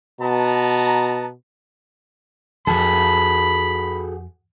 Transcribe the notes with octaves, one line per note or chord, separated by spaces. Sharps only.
B2 B3 A5 A#5
F2 F#4 G#4 A4 B5